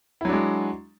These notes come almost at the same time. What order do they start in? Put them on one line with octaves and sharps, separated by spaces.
E4 F#3 D4 G#3